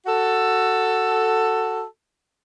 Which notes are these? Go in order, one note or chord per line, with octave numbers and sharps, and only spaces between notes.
F#4 A4